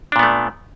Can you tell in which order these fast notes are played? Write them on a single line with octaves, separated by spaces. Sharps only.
D4 A#2 B3 A3